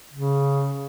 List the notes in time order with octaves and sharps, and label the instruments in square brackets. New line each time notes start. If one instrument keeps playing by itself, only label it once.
[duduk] C#3